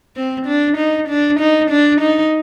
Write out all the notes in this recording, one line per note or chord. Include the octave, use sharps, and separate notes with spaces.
C4
D4
D#4
D4
D#4
D4
D#4